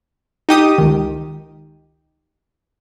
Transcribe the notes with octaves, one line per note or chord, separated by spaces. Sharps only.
D#4 G4 D#6
C#2 D#3